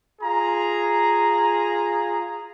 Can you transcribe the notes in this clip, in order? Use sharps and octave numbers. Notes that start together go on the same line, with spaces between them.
F4 G#4 A#5